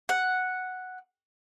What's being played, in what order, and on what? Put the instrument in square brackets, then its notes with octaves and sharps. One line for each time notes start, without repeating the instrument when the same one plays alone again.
[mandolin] F#5